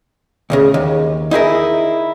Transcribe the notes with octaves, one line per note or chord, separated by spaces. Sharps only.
D2 A2 C#3
D#2
D#4 E4 G#4 A#4